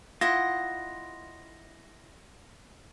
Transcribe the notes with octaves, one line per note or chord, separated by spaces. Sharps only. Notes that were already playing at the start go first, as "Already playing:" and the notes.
E4 F4 D#5 F#5 A#6